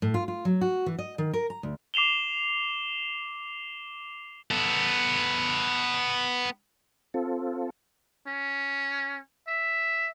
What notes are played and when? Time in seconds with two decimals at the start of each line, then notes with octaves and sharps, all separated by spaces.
0.02 A2
0.14 F4
0.28 F4
0.45 F#3
0.61 F#4
0.86 E3
0.99 D#5
1.18 D#3
1.34 A#4
1.50 A#5
1.63 D2
1.94 D6 C7 E7 F7 G7
4.51 B3 A4
7.14 C4 F4 A4
8.27 C#4
9.48 E5